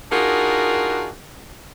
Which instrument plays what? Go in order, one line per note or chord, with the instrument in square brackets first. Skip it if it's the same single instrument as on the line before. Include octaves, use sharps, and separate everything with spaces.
[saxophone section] D4 D#4 F4 F#4 G#4 A#4